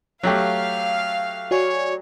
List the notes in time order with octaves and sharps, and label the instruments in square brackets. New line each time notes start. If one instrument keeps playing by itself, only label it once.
[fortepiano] F#3 A3 G4 [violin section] F5
[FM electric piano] F#4 D5 G#5 [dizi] C#5